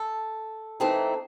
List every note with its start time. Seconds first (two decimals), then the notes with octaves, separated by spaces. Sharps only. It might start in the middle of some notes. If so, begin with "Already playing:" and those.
Already playing: A4
0.80 E3 A3 C4 D#4